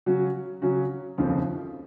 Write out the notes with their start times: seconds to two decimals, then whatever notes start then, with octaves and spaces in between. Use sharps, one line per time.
0.06 C#3 F#3 C#4 F#4
0.62 C#3 F#3 C#4 F#4
1.18 F1 D#2 C#3 F3 C4